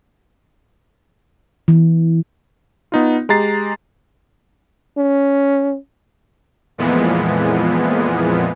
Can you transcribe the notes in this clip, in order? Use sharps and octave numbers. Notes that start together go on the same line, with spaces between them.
E3
B3 D#4 F4
G#3 G4 A#5 A6 C7
C#4
F2 A#2 E3 F3 G#3 B3